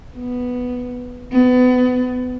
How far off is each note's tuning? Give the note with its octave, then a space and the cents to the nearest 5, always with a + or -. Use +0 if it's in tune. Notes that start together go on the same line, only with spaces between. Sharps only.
B3 +0
B3 +30